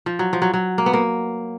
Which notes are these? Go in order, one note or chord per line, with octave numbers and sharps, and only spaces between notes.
F3
F#3
F3
F#3
F#3
A#3
B3
A#3